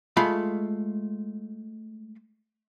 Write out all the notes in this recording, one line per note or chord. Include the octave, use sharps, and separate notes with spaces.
G#3 A3 F4 F5 B5